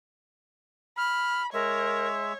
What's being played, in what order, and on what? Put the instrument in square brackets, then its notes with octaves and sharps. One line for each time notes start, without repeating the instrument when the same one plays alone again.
[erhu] B5 [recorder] F6
[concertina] G#3 E5 [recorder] A#4 [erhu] C#5